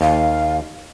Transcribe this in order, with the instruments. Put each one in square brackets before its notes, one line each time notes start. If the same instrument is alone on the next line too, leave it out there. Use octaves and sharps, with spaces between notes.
[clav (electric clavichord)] D#2 [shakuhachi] F5